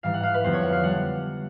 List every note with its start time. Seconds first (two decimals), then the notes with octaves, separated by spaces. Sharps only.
0.03 G#2 E3 G3 F5
0.14 F#5
0.23 F5
0.34 B4
0.43 F2 D3 G3 B3 C5
0.53 C#5
0.63 F#5
0.73 F5
0.83 D3 G3 F#5